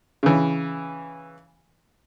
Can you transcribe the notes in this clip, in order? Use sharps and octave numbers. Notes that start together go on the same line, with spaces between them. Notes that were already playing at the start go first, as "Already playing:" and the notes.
C#3 E3